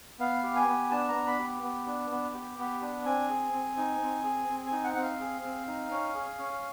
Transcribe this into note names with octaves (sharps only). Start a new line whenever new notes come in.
B3 F5
G4
G#5
B3
D4 A5
A#5
B3
B5
G4
B3
D4
B3
G4
B3
D4
C4 G#5
G#4
C4
D#4
C4
G#4
C4
D#4 G#5
F#5
C4 F#5
F5
G#4
C4
D#4
C#4
G#4
C#4